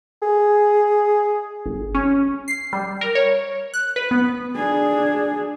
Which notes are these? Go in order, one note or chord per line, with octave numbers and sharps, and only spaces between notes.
G#4
G1
C#4
C7
G3
A#4
C#5
F#6
B4
B3
D4 G#4